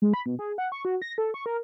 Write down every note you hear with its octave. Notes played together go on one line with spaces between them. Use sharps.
G#3
B5
B2
G#4
F#5
C#6
F#4
A#6
A4
C#6
A#4